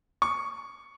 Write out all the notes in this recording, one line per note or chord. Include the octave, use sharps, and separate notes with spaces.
C#6